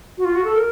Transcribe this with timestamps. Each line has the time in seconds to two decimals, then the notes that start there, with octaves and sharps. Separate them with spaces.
0.18 F#4
0.25 F4
0.35 F#4
0.44 A4
0.55 A#4